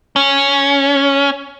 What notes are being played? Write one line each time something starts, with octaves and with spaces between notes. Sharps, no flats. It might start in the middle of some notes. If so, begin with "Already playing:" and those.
C#4